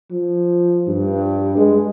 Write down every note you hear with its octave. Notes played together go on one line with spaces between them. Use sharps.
F3
G2
G#3